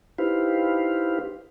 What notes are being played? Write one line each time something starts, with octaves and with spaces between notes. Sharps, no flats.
D#4 E4 G4 B4 C5 F5